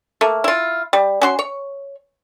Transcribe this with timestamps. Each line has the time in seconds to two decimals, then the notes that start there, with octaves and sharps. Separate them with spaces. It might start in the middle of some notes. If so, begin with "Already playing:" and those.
0.21 A3 A#3
0.44 E4 F4
0.93 G3
1.21 C#4 F#4 C6
1.39 C#5